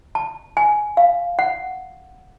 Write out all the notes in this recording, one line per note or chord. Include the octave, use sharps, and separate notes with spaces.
A5
G#5
F5
F#5